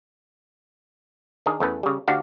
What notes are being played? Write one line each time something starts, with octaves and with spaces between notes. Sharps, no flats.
D#3 D4 G#4 A#4
E2 A3 C#4 A4 B4
C#3 G3
D2 D4 F#4 G4 F5